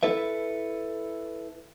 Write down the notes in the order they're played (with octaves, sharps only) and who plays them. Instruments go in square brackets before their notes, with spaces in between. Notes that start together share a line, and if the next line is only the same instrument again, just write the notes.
[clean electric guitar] E4 A4 B4 E5